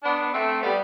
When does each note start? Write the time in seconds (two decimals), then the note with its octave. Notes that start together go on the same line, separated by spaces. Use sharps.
0.04 B3 D4
0.22 B3
0.33 A3 C4
0.63 G3 B3